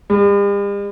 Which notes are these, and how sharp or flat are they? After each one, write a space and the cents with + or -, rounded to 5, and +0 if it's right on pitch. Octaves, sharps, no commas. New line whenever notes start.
G3 +45